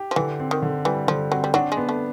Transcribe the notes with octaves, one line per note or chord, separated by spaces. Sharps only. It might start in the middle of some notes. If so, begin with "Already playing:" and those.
Already playing: G4
F3
D3 E3
C4
D#3
D3
E3 G3
D3 F3
F#3 C4
G3
F#3 D4
G#3
B3
A3